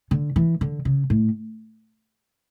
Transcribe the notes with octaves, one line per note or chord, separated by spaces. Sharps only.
D3
E3
D3
C#3
A2